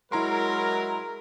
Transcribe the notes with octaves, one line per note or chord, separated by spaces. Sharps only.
F#3 G#3 E4 A#4 A#5 C6